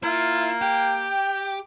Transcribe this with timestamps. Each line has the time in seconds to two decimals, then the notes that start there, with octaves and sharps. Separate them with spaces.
0.04 A#3 E4 F4
0.62 G4 G5